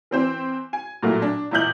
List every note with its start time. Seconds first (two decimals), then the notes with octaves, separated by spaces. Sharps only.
0.11 E3 C4 C5
0.73 G#5
1.03 A#2 F#3 A3 A#3 E4
1.22 D4
1.51 E2 A#2 E4 D#5 G6 F#7